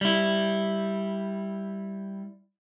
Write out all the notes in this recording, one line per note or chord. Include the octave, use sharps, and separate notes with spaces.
G3 E4